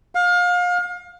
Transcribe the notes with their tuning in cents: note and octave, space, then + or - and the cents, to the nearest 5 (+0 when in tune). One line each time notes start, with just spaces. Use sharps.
F5 +30